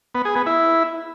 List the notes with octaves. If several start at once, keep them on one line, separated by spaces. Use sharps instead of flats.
B3
G#4
B3
E4